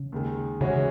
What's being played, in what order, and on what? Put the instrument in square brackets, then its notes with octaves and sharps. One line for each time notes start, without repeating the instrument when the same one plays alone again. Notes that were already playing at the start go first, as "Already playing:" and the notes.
Already playing: [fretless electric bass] C#3
[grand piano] D#2 D#3 G#3
[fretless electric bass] C#3 [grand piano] E3 G#3 C#4 F#4